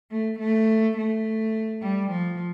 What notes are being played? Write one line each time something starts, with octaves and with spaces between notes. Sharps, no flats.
A3
A3
A3
G3
F3